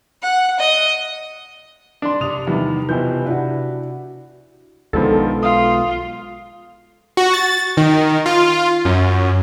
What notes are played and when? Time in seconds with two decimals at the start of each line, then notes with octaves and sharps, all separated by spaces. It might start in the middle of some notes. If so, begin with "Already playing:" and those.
0.22 F#5
0.59 D#5
2.02 D4 C6
2.21 C3 D4 D#6 F7
2.47 E2 D#3 G3
2.89 B2 E3 F3 G5 G6
3.26 D4 E4 F#4 B4
4.93 B1 D3 D#3 F3 G#3 B3 A4
5.43 F4 F5 D#6
7.17 F#4
7.33 A6
7.77 D#3
8.26 F4
8.85 F#2